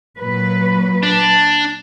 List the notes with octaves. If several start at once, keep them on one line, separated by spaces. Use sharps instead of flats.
A#2 F#3 B4
D4